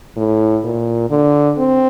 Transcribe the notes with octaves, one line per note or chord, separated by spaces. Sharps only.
A2
A#2
D3
C4